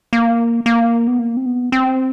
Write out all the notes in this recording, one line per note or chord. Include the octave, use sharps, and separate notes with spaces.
A#3
A#3
B3
A#3
C4
B3
C4